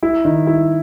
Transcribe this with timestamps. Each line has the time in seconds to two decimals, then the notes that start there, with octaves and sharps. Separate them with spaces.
0.03 E4
0.25 D#3
0.47 E4